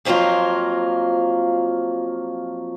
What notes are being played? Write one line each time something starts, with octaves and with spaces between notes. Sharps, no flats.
F2 F3 F#3 A#3 F4